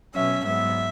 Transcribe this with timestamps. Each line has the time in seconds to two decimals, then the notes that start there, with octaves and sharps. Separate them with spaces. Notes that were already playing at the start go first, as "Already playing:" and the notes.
0.14 B2 F#3 C#4 E5
0.45 G#2 F#3 B3 E5